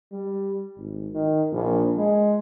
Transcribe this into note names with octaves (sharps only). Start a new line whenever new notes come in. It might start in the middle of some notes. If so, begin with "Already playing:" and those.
G3
G#1
D#3
A#1
G#3